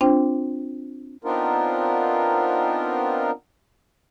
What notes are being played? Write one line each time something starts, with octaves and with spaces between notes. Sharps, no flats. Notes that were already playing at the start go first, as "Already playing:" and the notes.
C4 D4 F4 C5 G5
B3 C4 D4 D#4 F4 A#4